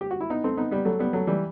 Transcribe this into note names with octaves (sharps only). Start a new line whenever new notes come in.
G4
F#4
E4
B3 D#4
A3 C4
B3 D#4
G3 B3
F#3 A3
G3 B3
F#3 A3
E3 G3